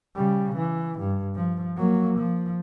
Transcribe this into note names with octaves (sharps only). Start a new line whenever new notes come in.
C#3 G3
E3
G2
F3
F#3 A#3
F3